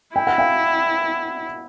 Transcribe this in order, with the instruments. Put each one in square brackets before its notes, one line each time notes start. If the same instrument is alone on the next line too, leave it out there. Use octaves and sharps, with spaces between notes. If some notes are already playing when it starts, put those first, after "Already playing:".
[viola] E4 [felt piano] G5
[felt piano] F#5
F5 G5